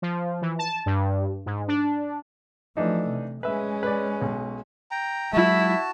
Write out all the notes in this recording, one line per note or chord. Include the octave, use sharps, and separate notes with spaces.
F3
E3
A5
G2
G#2
D4
E3 F3 A3 D4 D#4
C3
G#3 C#4 B4 E5
B4 D5
B1
G5 A#5
F#3 G#3 E4 F#4 A5